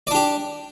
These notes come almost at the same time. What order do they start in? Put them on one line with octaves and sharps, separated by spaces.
D5 D4 G4